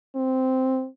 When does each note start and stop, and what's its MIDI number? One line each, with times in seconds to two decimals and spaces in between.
0.15 0.86 60